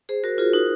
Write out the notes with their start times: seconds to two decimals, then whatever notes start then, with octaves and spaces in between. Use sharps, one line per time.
0.09 G#4 C5
0.23 F#4 A#4
0.38 F4 G#4
0.53 D#4 F#4